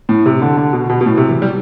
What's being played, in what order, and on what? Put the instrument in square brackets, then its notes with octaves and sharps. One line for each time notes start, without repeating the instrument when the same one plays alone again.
[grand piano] A2
C3
D3
D3
B2
B2
B2
A2
C3
E3
G3